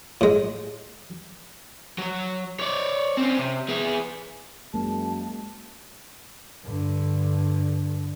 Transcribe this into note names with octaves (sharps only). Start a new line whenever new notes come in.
A2 G#3
F#3 C#5
C#5 D5
C4 C#4
C3
B3 G#4
F#2 G#3 A#3 A5
G2 D3